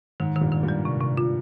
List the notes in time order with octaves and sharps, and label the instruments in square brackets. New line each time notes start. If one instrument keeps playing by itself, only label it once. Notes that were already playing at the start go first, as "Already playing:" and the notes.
[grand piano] G#2 [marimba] D#3
[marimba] D#3
[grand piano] G2 A#2
[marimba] D#3
[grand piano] G2 A#2
[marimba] G3
C3
C3
F4